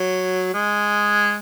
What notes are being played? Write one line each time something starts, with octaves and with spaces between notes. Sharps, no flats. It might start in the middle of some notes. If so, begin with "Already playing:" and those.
Already playing: F#3
G#3